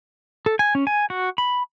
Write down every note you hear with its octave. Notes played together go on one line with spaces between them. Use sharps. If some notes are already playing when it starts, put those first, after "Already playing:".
A4
G#5
C#4
G#5
F#4
B5